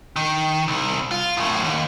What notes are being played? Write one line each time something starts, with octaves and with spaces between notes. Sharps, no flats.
D#3
C2
F4
F#2 A2
D#2